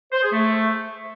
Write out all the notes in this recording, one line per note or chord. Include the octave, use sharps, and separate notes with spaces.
C5
G#4
A3